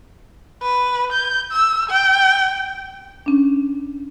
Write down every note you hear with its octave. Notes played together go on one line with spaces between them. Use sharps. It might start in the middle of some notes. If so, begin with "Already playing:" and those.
B4
G6
E6
G5
C#4 D4